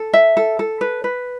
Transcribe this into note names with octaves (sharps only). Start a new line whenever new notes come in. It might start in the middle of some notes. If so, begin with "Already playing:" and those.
Already playing: A4
E5
A4
A4
B4
B4